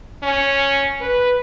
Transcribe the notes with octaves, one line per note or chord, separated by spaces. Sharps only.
C#4
B4